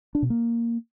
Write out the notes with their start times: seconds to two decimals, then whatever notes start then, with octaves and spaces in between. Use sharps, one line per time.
0.15 D4
0.22 B2
0.30 A#3